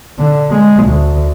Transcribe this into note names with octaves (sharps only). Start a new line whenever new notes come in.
D3
G#3
D2